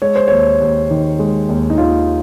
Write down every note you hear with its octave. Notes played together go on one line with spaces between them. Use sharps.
G#3 C#5
C5
D#2 C#5
D#2
D#3
G#3
D#2
D#4
D#2 F4